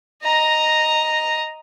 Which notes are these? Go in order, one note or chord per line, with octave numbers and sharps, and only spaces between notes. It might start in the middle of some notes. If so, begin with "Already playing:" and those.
D#5 A#5